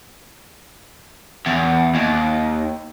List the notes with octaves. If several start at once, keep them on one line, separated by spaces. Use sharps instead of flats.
E2
D#2